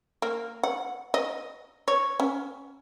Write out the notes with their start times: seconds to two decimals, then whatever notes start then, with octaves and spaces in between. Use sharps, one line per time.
0.22 A#3
0.63 F#5
1.14 D#5
1.88 C#5
2.20 C#4